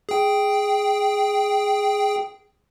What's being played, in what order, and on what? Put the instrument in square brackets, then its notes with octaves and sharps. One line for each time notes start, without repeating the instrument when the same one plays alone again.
[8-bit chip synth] G#4 G5